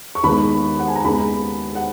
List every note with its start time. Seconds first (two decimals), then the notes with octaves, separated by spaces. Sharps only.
0.15 C#6
0.23 D#2 D#3 G#3 B3 B5
0.79 F#5
0.88 G#5
0.96 A#5
1.05 D#2 C#3 G#3 B3 B5
1.75 F#5